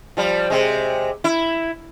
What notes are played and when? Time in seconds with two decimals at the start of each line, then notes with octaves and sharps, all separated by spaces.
0.17 F3 G3
0.50 C3 G#3
1.24 E4